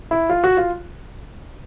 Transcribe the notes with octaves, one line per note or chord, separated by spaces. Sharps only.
E4
F4
F#4
F4